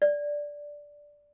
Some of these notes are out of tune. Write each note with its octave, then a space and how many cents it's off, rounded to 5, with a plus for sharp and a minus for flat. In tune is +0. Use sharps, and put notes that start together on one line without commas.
D5 -5